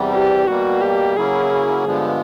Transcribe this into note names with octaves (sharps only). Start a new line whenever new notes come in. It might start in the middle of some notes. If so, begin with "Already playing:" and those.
Already playing: E2 C3 E3 G3
G4
B2 G3 A#3 F#4
G4
C#3 F#3 A#3 C#4 E4 G#4
G2 D3 F3 G#3 B3